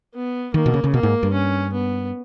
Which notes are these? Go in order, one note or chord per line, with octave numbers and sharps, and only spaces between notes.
B3
D#3 A#3
B2
C#3
C#3
B2 A#3
G#2
G2
C#4
B3